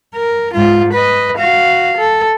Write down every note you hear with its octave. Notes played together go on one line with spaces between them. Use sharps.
A#4
G#2 F4
B4 D#5
F#4 F5
A4